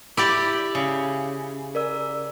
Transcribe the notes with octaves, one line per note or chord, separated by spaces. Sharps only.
E4 G4 D5 D6
C#3 D#6
A#4 D5 E6